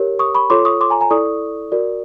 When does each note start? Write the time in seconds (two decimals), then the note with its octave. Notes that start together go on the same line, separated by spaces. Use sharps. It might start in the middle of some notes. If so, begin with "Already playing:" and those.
Already playing: G4 A#4 C#5
0.19 C#6 D#6
0.35 B5 C#6
0.50 F4 A4 C#5 C6 D6
0.65 C#6 D#6
0.81 C6 D6
0.90 G#5 A#5
1.01 G#5 A#5
1.10 E4 A4 D5 C#6 D#6
1.72 F#4 A#4 D5